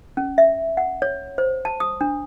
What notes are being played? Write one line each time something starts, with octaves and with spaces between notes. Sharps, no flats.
C#4
E5
F#5
C#5
C5
A5
D#6
D4